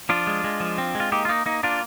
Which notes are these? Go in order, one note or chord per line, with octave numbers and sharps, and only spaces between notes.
F3 D4 F4
G#3
G#3
F3
C4
G#3
F4
A#3 D#4 G4
F4
A#3 D#4
A#3 D#4
A#3 D4 F4